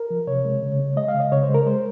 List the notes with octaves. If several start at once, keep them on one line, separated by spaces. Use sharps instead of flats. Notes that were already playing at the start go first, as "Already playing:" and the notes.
Already playing: A#4
F3
C3 C#5
G#3
C#3
G#3
G#3 D#5
F5
C#3
D#5
C#3 C#5
C5
G#3
A#4
G#3 C5